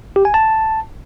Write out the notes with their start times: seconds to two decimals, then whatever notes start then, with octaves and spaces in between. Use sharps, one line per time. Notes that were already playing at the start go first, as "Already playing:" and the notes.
0.16 G4
0.25 G#5
0.34 A5